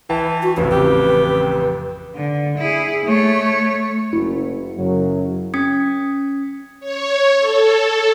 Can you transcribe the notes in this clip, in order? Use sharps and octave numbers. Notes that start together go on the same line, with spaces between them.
E3 B4 G5 A5
F#4
A1 F2 C#3 B4
G4
D3
E4 G#4
A3 C#5
F#1 F#2 E4
F#2 C#3 F#3
C#4 D#6 G#6 B6 C#7
C#5
A4